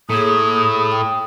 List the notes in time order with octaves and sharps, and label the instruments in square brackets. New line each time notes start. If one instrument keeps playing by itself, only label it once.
[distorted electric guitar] A2 [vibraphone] A#3 G#4 [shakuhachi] D#6
[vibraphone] G5 D#6